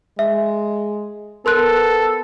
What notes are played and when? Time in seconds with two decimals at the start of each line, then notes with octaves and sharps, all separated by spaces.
0.19 G#3 E5
1.46 B3 A4 A#4 C6 F#6